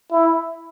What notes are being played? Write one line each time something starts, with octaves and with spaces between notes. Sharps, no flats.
E4